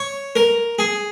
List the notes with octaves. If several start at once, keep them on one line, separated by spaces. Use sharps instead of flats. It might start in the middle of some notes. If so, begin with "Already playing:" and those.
Already playing: C#5
A#4
G#4